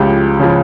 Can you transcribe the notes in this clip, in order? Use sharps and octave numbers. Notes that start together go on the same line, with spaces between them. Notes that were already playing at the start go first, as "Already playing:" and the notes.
Already playing: C#2 C#3 F3 F4 G4
C#3 F3